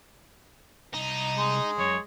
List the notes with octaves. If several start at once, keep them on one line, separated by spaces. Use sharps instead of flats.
C2 D#4 A#5
G#3
F#2 C#5